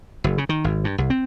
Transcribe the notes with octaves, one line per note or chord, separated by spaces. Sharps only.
F#1
C#3
D#3
G#1
G2
C2
C4